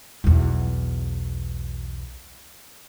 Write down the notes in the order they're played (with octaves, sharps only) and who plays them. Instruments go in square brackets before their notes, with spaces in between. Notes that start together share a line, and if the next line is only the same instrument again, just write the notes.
[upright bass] B1 E2